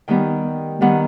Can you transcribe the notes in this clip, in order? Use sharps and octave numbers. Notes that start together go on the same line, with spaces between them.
D#3 G3 B3 G5
D#3 G3 B3 F#5